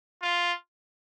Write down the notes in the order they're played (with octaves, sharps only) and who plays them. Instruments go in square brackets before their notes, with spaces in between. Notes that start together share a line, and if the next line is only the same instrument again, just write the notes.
[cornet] F4